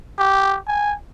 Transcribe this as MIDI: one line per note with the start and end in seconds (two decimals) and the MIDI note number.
0.18 0.57 67
0.68 0.95 80